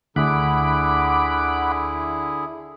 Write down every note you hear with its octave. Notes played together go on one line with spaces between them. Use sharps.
D2 D3 E4 G#4 F#5 B5 D6